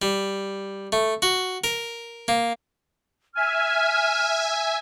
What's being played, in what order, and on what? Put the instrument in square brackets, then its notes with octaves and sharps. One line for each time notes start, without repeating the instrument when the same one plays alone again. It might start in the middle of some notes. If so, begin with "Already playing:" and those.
[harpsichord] G3
A3
F#4
A#4
A#3
[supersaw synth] E5 G#5 [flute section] F6